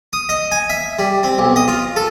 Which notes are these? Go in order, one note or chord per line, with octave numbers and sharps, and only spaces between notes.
D#6
D#5
G#5
E5
G3
C4
B1
D#5
F4
A4